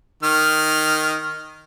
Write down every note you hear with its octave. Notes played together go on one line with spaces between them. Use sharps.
D#3 F6